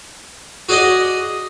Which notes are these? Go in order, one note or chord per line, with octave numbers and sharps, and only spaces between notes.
F#4 G#4 D5 D#5